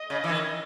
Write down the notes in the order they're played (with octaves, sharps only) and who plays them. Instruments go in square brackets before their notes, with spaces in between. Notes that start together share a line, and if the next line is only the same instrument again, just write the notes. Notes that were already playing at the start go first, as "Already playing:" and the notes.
Already playing: [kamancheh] D#5
[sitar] C#3
E3
D#3